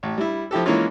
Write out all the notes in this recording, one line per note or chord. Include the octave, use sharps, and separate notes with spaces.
A1
G3 E4
F3 E4 G4 A4
E3 G#3 A#3 C#4 E4 F4